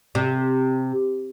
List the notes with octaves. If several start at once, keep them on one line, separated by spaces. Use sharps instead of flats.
C3